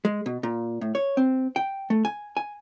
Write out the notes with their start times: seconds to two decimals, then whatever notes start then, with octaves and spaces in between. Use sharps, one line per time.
0.05 G#3
0.26 B2
0.43 A#2
0.81 A2
0.95 C#5
1.17 C4
1.56 G5
1.90 A3
2.05 G#5
2.37 G#5